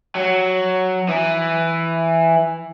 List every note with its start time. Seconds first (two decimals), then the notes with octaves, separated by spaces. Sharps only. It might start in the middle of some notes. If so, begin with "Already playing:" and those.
0.15 F#3
1.08 E3